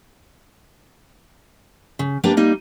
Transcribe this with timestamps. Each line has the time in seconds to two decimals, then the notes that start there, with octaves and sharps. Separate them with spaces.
1.99 C#3
2.24 A#3 D4 G4 B4 D5
2.37 G3 A#3 D#4